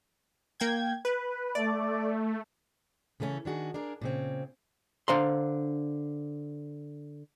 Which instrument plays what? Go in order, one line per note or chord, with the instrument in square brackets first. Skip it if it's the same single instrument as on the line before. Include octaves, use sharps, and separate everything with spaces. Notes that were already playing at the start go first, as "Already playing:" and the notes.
[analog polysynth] A#3 G5 G#6
B4
[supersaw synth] A3 [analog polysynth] D5
[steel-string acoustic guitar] C#3 E3 A3 B3 C#4
D#3 D4 F#4 G#4
D4 G#4 A#4
A#2 C#3 C4
[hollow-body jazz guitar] D3 D4 C5 F5 A#5 C6